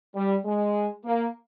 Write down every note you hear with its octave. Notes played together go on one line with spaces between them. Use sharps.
G3
G#3
A#3